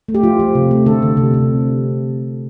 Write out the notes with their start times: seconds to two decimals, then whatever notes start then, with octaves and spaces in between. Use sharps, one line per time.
0.09 A3
0.15 G4
0.23 F3 F4
0.40 F3
0.55 C3
0.71 A3
0.86 D3 A4
1.02 D3
1.17 C3
1.34 C3